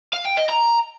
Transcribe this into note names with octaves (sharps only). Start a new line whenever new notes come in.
F5
G5
D#5
A#5